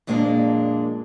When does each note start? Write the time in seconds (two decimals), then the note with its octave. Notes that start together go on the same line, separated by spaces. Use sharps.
0.07 F2 A#2 G#3 A#3 B3 D4